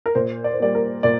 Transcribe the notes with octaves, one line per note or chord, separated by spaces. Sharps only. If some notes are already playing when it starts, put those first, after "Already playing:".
A#4
A#2 C5
D5
C5
G3 A#3 D5
A#4
A#2 D5